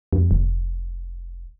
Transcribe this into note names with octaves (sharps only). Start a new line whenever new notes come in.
F2
F1